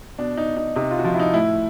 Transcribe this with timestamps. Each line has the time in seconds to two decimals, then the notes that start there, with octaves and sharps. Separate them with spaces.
0.18 B2 D4
0.38 D#4
0.57 D#4
0.76 C3 D#4
0.91 F4
0.99 F#4
1.05 F3 F4
1.14 E4
1.20 D#4
1.34 A2 E4